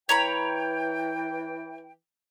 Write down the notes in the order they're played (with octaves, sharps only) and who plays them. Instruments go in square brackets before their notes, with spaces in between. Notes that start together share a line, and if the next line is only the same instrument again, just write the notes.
[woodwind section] E3 G5 [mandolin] C#5 A#5 B5